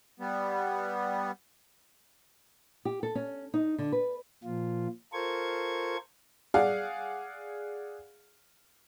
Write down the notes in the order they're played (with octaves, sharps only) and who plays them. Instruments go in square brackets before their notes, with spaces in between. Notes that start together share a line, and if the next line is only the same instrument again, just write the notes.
[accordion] G3 B3
[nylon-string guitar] G4
A4
C#4
D#4
D3
B4
[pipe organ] A#2 F3 F4
F4 A4 A#4 C5 C#6 G#6
[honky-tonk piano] G#4 D5 F5 F#5